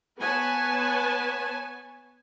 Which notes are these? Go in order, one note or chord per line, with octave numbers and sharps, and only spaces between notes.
B3 B4 C#5 G#5 A5